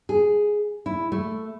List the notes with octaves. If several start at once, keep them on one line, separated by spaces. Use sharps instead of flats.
G#4
E4
A3